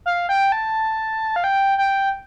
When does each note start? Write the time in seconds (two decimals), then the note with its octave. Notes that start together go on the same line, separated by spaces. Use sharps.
0.06 F5
0.29 G5
0.52 A5
1.36 F5
1.44 G5
1.78 G5